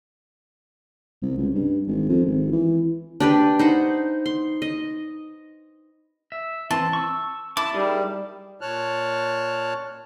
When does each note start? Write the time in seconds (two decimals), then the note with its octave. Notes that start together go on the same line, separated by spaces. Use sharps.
1.22 C2
1.37 C#2
1.55 G2
1.87 G#1
2.08 F2
2.25 G#1
2.52 E3
3.20 D4 G4 B4
3.59 D#4 C5 F#5
4.26 C6
4.62 D#5
6.32 E5
6.71 E3 C4 A5
6.93 C#6 E6
7.57 E4 A5 D6
7.74 G3 D#4 G#4 A#4
8.61 A#2 C#5 A5 F6 F#6